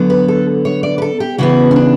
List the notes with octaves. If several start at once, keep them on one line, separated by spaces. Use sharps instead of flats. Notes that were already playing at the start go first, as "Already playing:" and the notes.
Already playing: D3 F#3 B3
B4
A4
C#5
D5
B4
A4
G4
C#3 E3 B3 F#4
C#4
D4